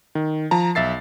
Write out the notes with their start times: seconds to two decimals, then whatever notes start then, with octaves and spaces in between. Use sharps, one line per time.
0.15 D#3
0.51 F3 A5 A#5
0.75 B1 E5 A6 C7